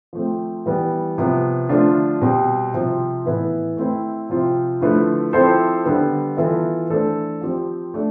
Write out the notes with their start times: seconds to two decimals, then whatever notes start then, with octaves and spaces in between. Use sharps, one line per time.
0.13 F3 A3 C4
0.66 E3 G3 B3
1.18 C3 F3 B3
1.69 D3 F3 A3 D4 F4
2.21 B2 G3 C4 G4
2.73 C3 F3 C4
3.25 A2 E3 B3 E4 B4
3.77 A3 C4 E4
4.29 C3 F3 C4 F4
4.81 D3 F3 A3 E4 B4
5.33 F3 C4 E4 A4 C5
5.85 D3 G3 B3
6.37 E3 B3 F4 A4 E5
6.89 E3 A3 D4 A4 C5
7.41 F3 C4 G4 C5
7.94 A3 D4